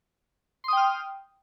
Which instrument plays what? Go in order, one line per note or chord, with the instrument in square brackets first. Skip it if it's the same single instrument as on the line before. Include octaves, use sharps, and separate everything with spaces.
[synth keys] C6
D#6
G5
F6